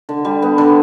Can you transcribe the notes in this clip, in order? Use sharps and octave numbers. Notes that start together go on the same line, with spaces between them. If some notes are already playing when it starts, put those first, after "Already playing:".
D3
G3
B3
D3